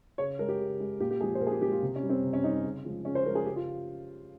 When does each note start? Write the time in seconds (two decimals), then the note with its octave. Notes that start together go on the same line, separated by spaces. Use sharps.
0.18 C#3 C#5
0.39 G#3 A#4
0.49 G4
0.59 C#3
0.80 G#3
1.00 A#2 G4
1.11 G4
1.21 F3 G#3 G#4
1.35 C5
1.41 A#2 A#4
1.47 G#4
1.51 G4
1.62 F3 G#3 G4
1.71 F4
1.82 C3
1.96 C#4
2.03 G3
2.09 C4
2.23 C3
2.33 C#4
2.43 G3 D#4
2.54 C#4
2.64 C#3
2.84 F3 G#3
3.05 C#3 C#4
3.15 C5
3.25 F3 G#3 A#4
3.35 G#4
3.45 C#3 G4
3.56 F4